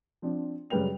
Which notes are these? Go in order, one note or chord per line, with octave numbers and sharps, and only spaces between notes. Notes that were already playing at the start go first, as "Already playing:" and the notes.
F3 C4 D4
F#2 C#3 G3 B4 G5 F7